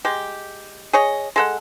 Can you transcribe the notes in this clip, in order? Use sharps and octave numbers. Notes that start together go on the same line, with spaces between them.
G#3 G4
G#4 C#5 D#5
G#3 A4 F#5